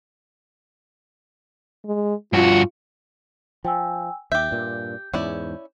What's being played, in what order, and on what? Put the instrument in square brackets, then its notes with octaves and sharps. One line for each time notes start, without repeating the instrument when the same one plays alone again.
[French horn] G#3
[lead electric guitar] G2 F#4 [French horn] F4
[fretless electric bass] F3 [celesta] G5 G#5 E6
[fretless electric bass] D#2 [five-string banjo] G4 E5 [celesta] G6
[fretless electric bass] G2 A#2
[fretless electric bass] E2 G#2 [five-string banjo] C#4 E4 D5